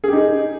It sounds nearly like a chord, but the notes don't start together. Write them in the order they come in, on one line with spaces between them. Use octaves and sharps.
G#4 G4 D#4